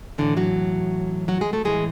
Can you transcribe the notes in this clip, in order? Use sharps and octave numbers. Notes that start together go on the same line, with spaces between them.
A2 D3 E3 D4
F#3 F#4
F#3 F#4
G#3 G#4
A3 A4
A2 E3 G#3 G#4